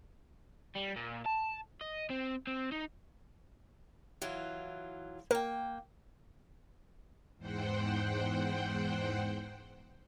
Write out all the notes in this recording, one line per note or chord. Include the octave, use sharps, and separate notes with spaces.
G3
A#2
A5
D#5
C4
C4
D#4
E3 F#3 F4
A#3 A#4 G5
E2 G#2 C5 F#5 G5